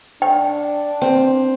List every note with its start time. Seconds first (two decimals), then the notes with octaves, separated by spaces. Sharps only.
0.22 D4 G5
1.02 C4